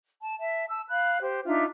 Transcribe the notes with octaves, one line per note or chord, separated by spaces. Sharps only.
A5
E5 A5
A5 E6
F5 B5 F#6
G4 C5
D4 D#4 F4 E5